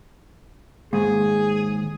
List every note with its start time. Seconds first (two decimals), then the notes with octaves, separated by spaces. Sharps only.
0.93 D#2 G#2 G#4